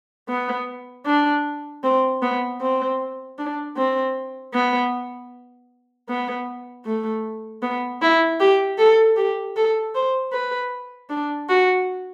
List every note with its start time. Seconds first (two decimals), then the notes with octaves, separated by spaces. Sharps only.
0.29 B3
1.06 D4
1.84 C4
2.22 B3
2.61 C4
3.39 D4
3.77 C4
4.54 B3
6.09 B3
6.85 A3
7.62 B3
8.02 E4
8.40 G4
8.79 A4
9.17 G4
9.56 A4
9.95 C5
10.32 B4
11.10 D4
11.49 F#4